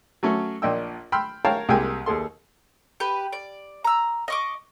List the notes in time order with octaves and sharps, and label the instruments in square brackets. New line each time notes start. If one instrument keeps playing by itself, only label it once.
[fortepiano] F#3 A3 C#4
A#1 A#2 D#5 G5 E6
G5 B5 C6 E6 F6
A#4 C#5 F5 G5 A5 A#5
C2 G3 G#3 A#3 G5 G#5
D#2 G#4 A4 C6
[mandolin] G4 B4
D5
A#5 E6
D#5 C#6 D6